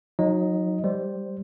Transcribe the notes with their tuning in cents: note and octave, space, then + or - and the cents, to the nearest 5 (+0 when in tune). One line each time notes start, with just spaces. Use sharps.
F#3 -30 D#4 +0 D#5 +0
G3 -5 C5 +0